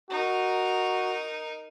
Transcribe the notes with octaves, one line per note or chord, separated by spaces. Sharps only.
D#4 F#4 A#4